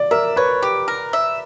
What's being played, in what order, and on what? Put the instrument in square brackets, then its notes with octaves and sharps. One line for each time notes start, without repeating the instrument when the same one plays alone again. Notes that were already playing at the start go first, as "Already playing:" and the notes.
Already playing: [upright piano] D5
[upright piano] A#4 [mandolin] E5
[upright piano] B4 [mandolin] C#5
[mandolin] G4
A#4
E5